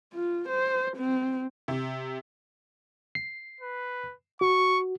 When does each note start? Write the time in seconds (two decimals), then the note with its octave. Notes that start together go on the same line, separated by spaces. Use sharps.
0.14 F4
0.48 C5
0.97 C4
1.68 C3
3.15 C7
3.61 B4
4.41 F#4 C#6